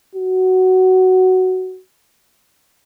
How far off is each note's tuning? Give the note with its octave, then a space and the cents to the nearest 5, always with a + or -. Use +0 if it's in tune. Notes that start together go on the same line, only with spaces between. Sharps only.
F#4 +10